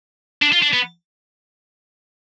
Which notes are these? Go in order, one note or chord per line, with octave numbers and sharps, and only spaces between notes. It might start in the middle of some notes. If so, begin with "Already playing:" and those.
D4
F4
D4
B3